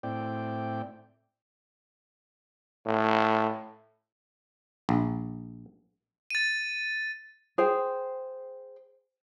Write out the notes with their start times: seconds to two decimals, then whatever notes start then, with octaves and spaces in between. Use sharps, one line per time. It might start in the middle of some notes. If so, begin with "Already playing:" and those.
0.03 A2 C4 E4 D5 G5
2.86 A2
4.89 A#1
6.30 A6 D#7
7.58 G#4 C5 G5